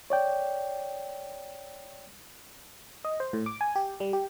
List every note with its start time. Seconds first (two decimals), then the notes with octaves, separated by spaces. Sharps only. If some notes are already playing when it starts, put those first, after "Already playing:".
0.10 C#5 D5 G5
3.05 D#5
3.20 C5
3.33 A2
3.46 D6
3.61 G#5
3.75 G4
4.00 G3
4.13 G4